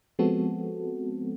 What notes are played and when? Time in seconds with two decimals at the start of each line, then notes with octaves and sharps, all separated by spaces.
0.19 F3 G#3 B3 C4 F#4 A4